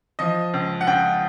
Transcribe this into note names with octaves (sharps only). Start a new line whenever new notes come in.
F3 D#5
C#2
F#5
C#2 G5